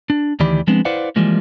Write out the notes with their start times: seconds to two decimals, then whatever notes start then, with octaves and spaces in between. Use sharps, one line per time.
0.10 D4
0.40 D2 D#3 E3 G4 D5 B5
0.67 F3 G#3 B3 C4 D4
0.85 E4 B4 C5 D5 F5 F#5
1.16 E3 F3 G3 G#3 A#3